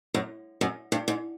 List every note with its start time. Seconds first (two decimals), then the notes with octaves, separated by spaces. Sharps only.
0.14 F#2
0.61 F#2
0.92 G2
1.08 G#2